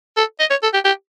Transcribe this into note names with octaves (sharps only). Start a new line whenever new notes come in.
A4
D#5
C#5
A4
G4
G4